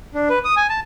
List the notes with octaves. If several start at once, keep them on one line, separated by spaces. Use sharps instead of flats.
D4
B4
D#6
G#5
A5